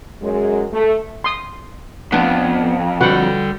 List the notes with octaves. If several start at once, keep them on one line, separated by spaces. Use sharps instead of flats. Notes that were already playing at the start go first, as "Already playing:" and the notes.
F#2 G#3
A3
C6 D#6
F2 B3 D4
D3 G3 F#4 B4 F#5